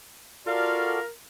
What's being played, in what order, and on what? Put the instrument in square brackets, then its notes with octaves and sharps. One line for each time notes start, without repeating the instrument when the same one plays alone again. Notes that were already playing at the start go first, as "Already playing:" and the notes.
[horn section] F4 F5 [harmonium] F#4 A4 D5 [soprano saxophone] A#4